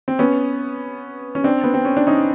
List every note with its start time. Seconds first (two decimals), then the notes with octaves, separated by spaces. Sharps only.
0.08 C4
0.19 B3 C#4
1.35 C#4
1.44 C4 D4
1.64 B3
1.74 C4
1.85 C#4
1.97 D4
2.07 C#4 D#4